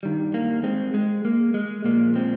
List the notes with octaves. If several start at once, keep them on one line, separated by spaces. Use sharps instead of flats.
G2 D#3 G3
A#3
G#3 C4
G#3
A#3
G#3
A#2 F3 A#3
G#3 C4